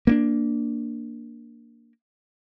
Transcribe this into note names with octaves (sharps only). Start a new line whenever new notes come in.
A#3 B3 D4